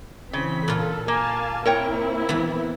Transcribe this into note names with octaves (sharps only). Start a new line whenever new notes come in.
C#3 E3 C4 B6
A#2 F4 A4
A#3 F5 G#5 A5
A#3 C4 E4 A#4 C#5 G5
E3 B3